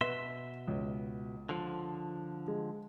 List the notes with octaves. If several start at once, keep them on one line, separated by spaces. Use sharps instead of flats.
B2 B4 E5 C6
C#2
D3 F3
G#3